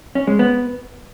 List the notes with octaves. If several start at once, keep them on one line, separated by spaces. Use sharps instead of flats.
C#4
G#3
B3